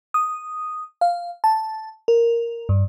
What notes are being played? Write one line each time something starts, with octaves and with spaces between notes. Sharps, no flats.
D#6
F5
A5
A#4
G2